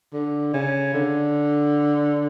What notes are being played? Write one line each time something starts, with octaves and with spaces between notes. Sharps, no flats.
D3
C#3
D3